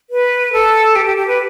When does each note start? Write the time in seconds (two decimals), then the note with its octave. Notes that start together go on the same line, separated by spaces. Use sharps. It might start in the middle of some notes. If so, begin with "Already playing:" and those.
0.10 B4
0.53 A4
0.96 G4
1.06 G4
1.17 G4
1.27 B4